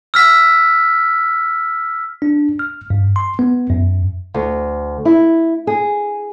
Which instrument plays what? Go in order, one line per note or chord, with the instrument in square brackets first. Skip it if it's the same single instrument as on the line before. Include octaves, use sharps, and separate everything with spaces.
[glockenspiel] E6 F6 B6
[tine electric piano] D4
F6
G2
C6
B3
F#2
[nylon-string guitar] D2
E4
G#4